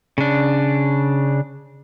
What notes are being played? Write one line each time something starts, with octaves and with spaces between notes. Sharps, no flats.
C#3 D4